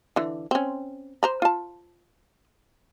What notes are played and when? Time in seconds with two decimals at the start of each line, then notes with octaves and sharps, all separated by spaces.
0.16 D3 E3
0.51 C4 C#4
1.23 C5 A#5 B5
1.42 F4 A5